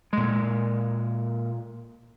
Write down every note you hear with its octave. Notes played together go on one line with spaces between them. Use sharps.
A#2 G#3